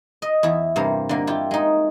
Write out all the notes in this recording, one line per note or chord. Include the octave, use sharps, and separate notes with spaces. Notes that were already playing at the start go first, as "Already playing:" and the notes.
D#5
E2 E4 E5
G2 C3 A#3
D3 A#3
E4 F4 G4
G#3 D#4